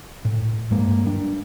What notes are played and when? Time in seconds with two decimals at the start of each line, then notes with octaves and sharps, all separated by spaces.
0.25 A2
0.71 G2 G#3 A#3
1.06 G3 D4